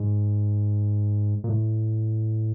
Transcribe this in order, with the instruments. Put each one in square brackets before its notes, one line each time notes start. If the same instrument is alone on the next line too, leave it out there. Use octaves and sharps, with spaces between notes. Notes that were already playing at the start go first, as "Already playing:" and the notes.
Already playing: [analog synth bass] G#2
A#2
A2